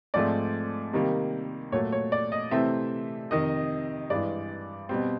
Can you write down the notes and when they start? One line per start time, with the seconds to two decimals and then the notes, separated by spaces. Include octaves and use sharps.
0.14 G#2 F3 A3 C4 D5
0.93 C3 D#3 G3 A#3
1.72 A#2 F#3 A3 C#5
1.92 C#5
2.12 D5
2.32 D#5
2.51 C3 E3 A3 C4 E5
3.31 F2 C3 D#3 D#5
4.10 G2 E3 G#3 D5
4.89 B2 G3 C4